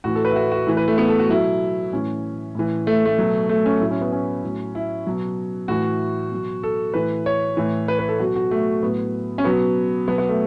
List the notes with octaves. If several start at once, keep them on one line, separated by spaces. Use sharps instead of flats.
A2 E3 F#4
A4
B4
E4
F#4
F#4
A2 E3
B4
A3
B3
A4
F#4
B2 F#3 E4
A2 E3 C#4
A2 E3
A3
A3
B2 F#3
A3
C#4
A2 F#3 E4
C#4
B3
C#4
A2 F#3
E4
B2 F#3
A2 E3 F#4
B2 F#3
A4
A2 E3 B4
C#5
A2 E3
B4
B4
A4
B2 F#3 F#4
F#4
A3
A2 F#3 B3
C#4
B2 F#3 B3
B2 F#3 B3
B3
A3